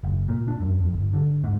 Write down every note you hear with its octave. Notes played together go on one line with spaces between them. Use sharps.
F#1
A#2
D4
F#2
F2
G1
D3
G#2